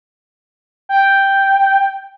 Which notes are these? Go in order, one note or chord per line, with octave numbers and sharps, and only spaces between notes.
G5